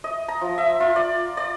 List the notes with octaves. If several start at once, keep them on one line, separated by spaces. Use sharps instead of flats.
D#5
A#5
F3
E5
F4
D5
D5